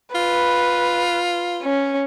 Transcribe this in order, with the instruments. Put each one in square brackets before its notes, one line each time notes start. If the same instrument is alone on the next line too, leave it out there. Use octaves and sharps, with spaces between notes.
[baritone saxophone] F4 [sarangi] B4
[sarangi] C#4